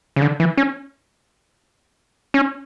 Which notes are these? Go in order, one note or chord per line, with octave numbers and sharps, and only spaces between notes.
C#3
D3
E3
C#4
C#4